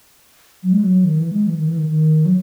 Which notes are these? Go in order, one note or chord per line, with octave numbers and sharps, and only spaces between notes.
F#3
G#3
F#3
D#3
E3
G#3
E3
D#3
E3
D#3
D#3
F#3